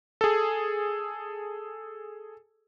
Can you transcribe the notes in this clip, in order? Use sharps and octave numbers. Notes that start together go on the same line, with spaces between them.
G#4 A4